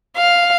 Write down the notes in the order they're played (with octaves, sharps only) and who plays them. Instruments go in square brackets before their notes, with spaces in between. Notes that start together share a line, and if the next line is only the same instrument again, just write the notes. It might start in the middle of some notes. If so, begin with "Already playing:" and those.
[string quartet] F5